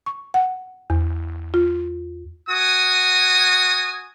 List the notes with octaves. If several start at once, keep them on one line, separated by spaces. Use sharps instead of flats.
C#6
F#5
E2
F4
F#4 G#5 D#6